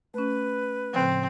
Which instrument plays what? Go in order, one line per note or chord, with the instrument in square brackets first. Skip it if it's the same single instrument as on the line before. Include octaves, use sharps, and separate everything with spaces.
[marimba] A3 C#4 [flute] B4
[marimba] A2 C#3 F3 [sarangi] C4